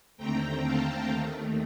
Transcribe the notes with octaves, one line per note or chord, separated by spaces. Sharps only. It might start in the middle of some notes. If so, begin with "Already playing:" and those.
D#2 D3 A3 C4 G5 A#5
F5 A5
D#2 D#3 A3